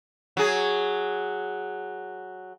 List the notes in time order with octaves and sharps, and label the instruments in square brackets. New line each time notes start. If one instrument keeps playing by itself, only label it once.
[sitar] F#3 G#4